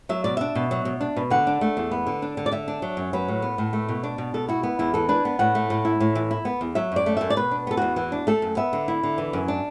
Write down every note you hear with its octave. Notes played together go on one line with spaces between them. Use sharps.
F#3 E5
B2 D5
D4 E5
B2
F#3
B2
D4
B2
D3 F#5
D4
A3
E2
B3
D3
D4
D3
D5
D3 E5
D4
F#3
F#2
F#3 B4
A2
B3
A2
A3
B2
D4
B2
B2 A4
E4 F#4
B3
E2 E4
E3 A4
D4 B4
B3
A2 F#5
A3
A2
E4
A2
E3
E4
B3
E2
F#3 E5
F#2 D5
A3
F#2 E5
D5
B2 B4
D4
B3 A4
E2 F#4
E3 F#4
D4
A3 A4
F#2
B3 E5
D3
E4
D3
E3
F#2
D4